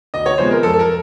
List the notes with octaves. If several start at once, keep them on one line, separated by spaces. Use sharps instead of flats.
D2 D#5
C#5
C3 F3 G#3 B3 C5
A#4
F2 A4
A4
A#4